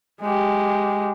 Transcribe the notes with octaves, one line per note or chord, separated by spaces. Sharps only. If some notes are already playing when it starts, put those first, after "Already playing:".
G#3 G4